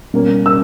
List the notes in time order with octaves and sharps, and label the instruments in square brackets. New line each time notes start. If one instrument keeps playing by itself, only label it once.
[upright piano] B2 G3 A#3 C#4
E6